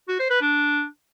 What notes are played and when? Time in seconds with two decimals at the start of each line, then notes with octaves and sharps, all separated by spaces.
0.08 F#4
0.19 C5
0.30 B4
0.41 D4